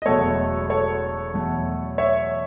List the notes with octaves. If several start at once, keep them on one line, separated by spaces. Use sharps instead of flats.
D#5
E1 E2 B2 F#3 A3 A4 C#5
A4 C#5
E2 B2 F#3 A3
C#5 E5